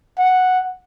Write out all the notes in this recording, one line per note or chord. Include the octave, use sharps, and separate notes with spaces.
F#5